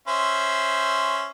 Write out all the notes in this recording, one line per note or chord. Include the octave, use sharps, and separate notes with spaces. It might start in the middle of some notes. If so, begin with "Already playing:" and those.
C#4 C5 E5